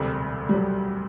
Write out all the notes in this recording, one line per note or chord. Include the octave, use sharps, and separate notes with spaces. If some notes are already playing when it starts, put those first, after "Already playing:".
Already playing: E1 D2 C3 G3
G3
F#3